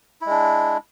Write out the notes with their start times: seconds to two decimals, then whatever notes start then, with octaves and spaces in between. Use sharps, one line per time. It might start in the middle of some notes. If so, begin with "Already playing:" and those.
0.21 E4
0.26 G#3
0.31 D4